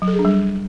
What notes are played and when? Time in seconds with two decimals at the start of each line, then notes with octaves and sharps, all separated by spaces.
0.02 F#3
0.08 A4
0.13 G#4
0.19 D4
0.25 G3